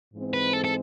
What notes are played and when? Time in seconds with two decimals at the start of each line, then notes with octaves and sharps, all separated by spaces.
0.14 G#2 E3 G#3 C4
0.34 B4
0.53 A4
0.64 A4